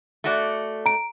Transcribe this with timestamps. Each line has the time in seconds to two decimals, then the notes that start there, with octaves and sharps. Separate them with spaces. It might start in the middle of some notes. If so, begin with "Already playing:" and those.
0.24 A3 F#4 D5
0.86 A#5 D7